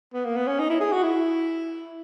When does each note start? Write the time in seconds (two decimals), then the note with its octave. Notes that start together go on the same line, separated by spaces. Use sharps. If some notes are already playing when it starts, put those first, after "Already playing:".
0.14 B3
0.25 A#3
0.36 B3
0.47 C#4
0.59 D#4
0.70 E4
0.80 G#4
0.93 F#4
1.03 E4